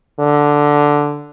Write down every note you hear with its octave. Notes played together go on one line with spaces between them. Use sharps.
D3